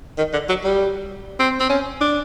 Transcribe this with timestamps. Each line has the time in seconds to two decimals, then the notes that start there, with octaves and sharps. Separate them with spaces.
0.18 D#3
0.33 D3
0.49 F#3
0.64 G3
1.39 C4
1.60 C4
1.69 C#4
2.01 D4